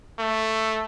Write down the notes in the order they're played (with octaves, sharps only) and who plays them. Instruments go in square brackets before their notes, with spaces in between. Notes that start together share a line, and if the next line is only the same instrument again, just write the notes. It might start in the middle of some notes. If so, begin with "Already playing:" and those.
[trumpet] A3